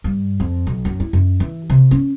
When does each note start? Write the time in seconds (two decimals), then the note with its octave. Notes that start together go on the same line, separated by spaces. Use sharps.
0.04 G2
0.40 F2
0.67 B1
0.85 F#2
1.00 E4
1.13 F#2
1.40 E3
1.70 C3
1.91 C#4